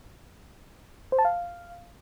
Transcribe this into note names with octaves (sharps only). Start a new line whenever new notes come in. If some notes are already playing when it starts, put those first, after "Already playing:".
C5
A5
F5